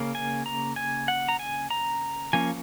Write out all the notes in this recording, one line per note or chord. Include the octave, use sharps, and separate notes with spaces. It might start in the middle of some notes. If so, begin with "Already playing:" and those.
Already playing: C#3 A#3 C#4
G#5
A#5
G#5
F#5
A#5
G#5
A#5
F3 A#3 C#4 G#5